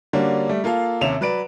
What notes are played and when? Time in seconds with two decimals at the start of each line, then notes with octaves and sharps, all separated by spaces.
0.13 D3 G3 A#3 C#4 D4 F#4
0.49 G3 A3
0.64 A#3 F4 A4 F5
1.01 D#2 C3 C#4 E5 E7 F7
1.21 F#3 B4 D5 D7